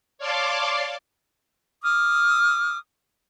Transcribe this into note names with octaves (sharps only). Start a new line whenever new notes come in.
C#5 D5 F5 A5 C6 D6
D6 D#6 F6